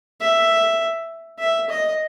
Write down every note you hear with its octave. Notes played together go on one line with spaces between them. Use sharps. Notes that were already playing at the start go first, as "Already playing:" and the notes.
E5
E5
D#5